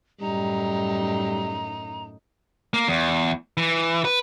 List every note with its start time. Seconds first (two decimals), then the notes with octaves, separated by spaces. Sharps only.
0.21 F#2 A2 G3 D#4 A#5
2.73 A#3
2.88 E2
3.57 E3
4.05 B4